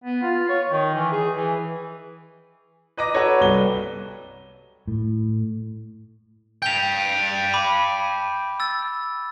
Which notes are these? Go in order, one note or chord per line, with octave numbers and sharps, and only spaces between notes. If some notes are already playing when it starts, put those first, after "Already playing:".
B3
F4
C#5
D#3
E3
G#4
E3
B4 D#5 A#5 D6 A#6
F#4 A4 B4 C#5
C2 G7
A2
G5 A5 G6 F7
B5 D6
E6 A6